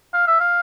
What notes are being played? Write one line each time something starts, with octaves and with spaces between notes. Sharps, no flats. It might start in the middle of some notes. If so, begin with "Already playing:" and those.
F5
E5
F5